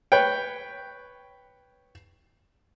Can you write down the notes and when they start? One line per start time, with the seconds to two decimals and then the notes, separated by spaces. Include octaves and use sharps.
0.12 B4 C#5 G5